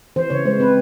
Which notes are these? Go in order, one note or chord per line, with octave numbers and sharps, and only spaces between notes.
E3 C5
C#3 C#5
G#3 C5
C4 B4